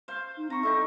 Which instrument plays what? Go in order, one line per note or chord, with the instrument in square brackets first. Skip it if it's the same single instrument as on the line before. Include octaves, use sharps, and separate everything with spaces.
[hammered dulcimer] C5 F5
[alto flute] D#4
[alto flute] C4 [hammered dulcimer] A#5 C#6
[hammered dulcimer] G3 D#4 E4 [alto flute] A4